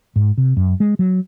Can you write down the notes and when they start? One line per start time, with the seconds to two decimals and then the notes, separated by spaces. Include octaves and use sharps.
0.16 G#2
0.38 C3
0.57 F#2
0.80 G#3
0.99 F#3